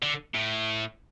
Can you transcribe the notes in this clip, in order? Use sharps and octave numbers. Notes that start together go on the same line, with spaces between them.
D3
A2